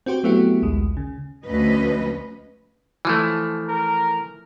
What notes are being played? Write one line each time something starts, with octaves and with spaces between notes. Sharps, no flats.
C4 F#4 G4 C5
F#3 A3 B3 E4 F#4 G4
A#1 D#2 G#3
C#3
D2 F3 C#4 B4 D#5
E3 F3 A3
A#4